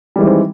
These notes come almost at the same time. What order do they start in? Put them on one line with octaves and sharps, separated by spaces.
G3 E3 G#3 D#3 C4